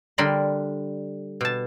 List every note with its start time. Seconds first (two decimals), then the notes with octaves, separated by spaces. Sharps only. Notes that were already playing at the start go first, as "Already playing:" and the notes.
0.18 D3 G3 A#4 B5 C6
1.41 B2 A5